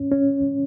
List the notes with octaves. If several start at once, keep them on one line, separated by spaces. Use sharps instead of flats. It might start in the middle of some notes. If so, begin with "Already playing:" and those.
Already playing: C#4
C#4